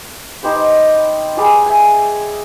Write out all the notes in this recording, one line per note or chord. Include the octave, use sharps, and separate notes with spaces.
D#4 G4 C5 B5
G3 G#4 D5 G#5
E5 G#5